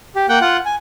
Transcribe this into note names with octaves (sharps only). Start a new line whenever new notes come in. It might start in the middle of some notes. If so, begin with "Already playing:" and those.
G4
A#3 F#5 G5
F4 F#5
G#5